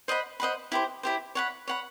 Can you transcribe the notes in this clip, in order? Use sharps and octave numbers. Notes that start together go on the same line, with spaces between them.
C5 D#5 F#5 B5
C5 D#5 F#5 B5
E4 G4 C5
E4 G4 C5
C#5 F#5 B5
C#5 F#5 B5